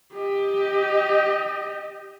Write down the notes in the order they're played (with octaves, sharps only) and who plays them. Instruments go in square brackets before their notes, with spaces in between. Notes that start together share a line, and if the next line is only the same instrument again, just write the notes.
[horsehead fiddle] G4 D#5